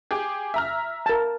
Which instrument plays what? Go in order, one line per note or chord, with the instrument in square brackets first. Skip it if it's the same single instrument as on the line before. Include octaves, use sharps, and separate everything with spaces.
[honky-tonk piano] G4 G#4
E5 A#5 F6
[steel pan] A#4 A5